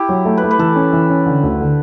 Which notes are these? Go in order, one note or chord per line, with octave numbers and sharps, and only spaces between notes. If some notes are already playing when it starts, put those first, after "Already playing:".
Already playing: E4 G4
F#3
A3
B4
A3
B4
E3 A4
C#4
E3
C#4
D3
D2
D3